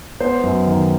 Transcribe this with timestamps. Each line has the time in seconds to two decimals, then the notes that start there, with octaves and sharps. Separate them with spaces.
0.20 B3 C5
0.43 F#2
0.67 D#3